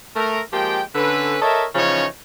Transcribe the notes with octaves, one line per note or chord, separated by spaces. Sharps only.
A3 A#4
F3 G#3 A#3 G4 G5
D3 C#4 A4 B4
A4 A#4 C#5 D#5 E5
C#3 E3 F3 C#4 D#4 C#5